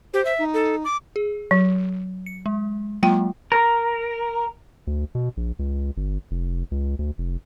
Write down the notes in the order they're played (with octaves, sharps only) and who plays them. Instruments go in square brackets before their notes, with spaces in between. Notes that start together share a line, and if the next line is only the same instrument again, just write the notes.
[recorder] G4 [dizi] C5
[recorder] E5
[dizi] D#4
[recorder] A4
D6
[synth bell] G#4
[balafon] F#3
[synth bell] C#7
G#3
[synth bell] F#3 G#3 A#3 [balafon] F4 G5
[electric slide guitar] A#4
[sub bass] D2
B2
A#1
C#2
G1
F1
C#2
D2
F1